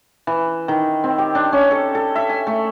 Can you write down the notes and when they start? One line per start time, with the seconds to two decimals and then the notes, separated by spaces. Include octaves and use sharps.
0.27 E3
0.68 D#3
1.04 C4
1.18 G4
1.35 D4
1.52 C#4
1.71 A4
1.95 A4
2.16 E5
2.29 G#5
2.47 A3